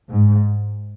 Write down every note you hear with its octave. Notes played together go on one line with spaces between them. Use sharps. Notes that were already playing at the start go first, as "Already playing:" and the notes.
G#2